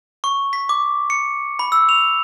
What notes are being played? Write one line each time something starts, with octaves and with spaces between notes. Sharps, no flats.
C#6
B6
D6
C#7
B5
E6
F7